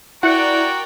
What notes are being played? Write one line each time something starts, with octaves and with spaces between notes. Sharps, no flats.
E4 F#4 A#4 D5 F#5 G5